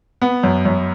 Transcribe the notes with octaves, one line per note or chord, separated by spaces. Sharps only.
B3
F#2
F#2